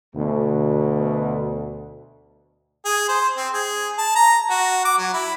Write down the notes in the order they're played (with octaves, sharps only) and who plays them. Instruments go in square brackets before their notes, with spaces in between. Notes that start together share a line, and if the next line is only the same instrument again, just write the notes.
[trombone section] D2 B2
[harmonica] G#4
C5
C4
G#4
A5
A#5
F#4
D6
F#3
E4